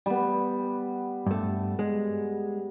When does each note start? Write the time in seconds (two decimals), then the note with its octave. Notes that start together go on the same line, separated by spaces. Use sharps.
0.06 G3 B3
1.27 G2 A3
1.79 G#3